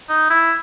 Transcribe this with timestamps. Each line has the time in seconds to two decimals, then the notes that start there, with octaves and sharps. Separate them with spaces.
0.09 D#4
0.30 E4